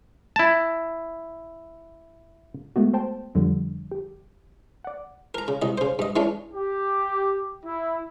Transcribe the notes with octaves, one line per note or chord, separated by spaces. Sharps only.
E4 A5
G#3 A3 B3 F#4
C5 G5 A5
F2 D3 F3 G3
G4
D5 F#5
A#4 A#5
C#3
C2 D#5
C#3 C5
G2 D#5
E3 G#3 C#4 D4
G4
E4